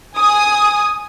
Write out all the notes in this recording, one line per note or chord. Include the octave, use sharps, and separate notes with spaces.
G#5 D#6